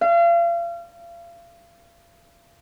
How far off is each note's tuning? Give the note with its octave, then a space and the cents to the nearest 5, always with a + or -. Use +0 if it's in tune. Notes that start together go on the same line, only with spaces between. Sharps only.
F5 -35